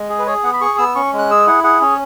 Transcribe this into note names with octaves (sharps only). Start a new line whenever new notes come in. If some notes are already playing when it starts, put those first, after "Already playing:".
Already playing: G#3
G#4
B4
G#4 C#5
B3 F#5
B5
G#4 C#6
B3 E6
C#4 C#6
G#3
F#6
G#4 E6
E4 F#5
G#4 F#5
C#4 C#5